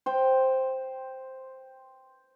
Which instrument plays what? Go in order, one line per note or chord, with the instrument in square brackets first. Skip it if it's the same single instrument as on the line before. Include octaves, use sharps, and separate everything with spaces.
[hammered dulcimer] C5 G5